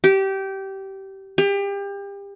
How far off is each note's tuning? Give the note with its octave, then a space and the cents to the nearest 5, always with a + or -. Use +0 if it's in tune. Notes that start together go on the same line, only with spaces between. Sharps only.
G4 -20
G4 +30